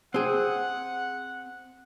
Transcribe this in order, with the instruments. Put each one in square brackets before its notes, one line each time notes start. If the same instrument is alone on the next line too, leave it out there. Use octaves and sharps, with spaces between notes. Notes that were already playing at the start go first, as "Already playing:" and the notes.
[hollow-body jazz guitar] C4 G#4 [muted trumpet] F#5